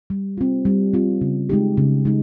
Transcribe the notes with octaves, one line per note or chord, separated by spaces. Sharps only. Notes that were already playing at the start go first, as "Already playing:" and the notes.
G3
C4 F4
G3
C4 F4
C#3
G#3 D#4 G4
C#3
G#3 D#4